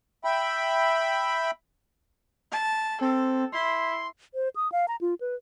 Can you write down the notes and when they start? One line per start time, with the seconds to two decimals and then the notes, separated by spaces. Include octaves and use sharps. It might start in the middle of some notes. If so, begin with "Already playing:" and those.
0.24 E5 G5 B5
2.52 A5
3.01 C4 A4
3.52 E4 C6
4.34 C5
4.56 D#6
4.72 F5
4.88 A#5
5.01 F4
5.21 B4